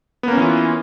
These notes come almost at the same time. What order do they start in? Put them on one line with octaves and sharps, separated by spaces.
B3 A#3 C#4 E3 F4